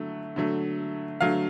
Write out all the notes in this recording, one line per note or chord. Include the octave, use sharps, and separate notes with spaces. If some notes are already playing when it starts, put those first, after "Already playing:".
Already playing: D3 F#3 A3
D3 F#3 A3
D3 F#3 A3 F5